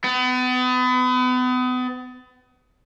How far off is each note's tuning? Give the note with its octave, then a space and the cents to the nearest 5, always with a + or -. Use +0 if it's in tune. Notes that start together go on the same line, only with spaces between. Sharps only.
B3 +35